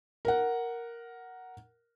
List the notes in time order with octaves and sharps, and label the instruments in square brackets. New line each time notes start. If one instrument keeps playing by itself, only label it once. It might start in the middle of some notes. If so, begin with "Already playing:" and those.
[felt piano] A#4 F#5